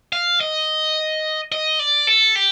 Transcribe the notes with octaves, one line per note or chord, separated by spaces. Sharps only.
F5
D#5
D#5
D5
A4
G4